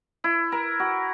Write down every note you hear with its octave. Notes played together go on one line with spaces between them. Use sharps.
E4
A#4
F#4